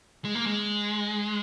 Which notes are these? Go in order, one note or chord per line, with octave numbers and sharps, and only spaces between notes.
G#3
A#3
G#3